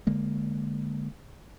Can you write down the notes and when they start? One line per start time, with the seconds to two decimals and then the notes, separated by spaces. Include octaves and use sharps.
0.07 D3 G#3 A#3